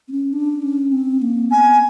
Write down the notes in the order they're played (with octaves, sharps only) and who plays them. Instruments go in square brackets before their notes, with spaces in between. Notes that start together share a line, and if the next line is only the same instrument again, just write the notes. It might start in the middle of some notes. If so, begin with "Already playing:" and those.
[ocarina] C4
C#4
D4
C#4
C4
A#3
[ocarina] B3 [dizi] G#5